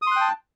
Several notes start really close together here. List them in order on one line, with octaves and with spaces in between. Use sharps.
D#6 C6 F#6 G5 A5